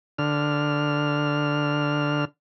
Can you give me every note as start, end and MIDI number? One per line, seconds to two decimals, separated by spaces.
0.18 2.25 50
0.18 2.25 89